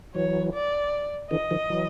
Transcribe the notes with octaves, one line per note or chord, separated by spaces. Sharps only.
E3 F#3 C#5
D5
D3 E3 D#5
D#3 F3
E3 F#3